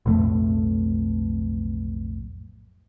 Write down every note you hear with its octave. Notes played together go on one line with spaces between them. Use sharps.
B1 F2 A2 A3